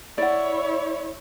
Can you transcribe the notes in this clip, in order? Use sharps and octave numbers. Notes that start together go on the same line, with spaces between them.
E4 C#5 D5 F#5